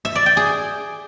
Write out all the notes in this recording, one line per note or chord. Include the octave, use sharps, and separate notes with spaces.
E5
D5
G5
G#4